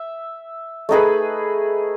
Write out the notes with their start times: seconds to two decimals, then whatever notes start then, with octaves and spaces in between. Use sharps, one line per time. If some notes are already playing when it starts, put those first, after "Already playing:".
Already playing: E5
0.89 A3 D#4 G#4 B4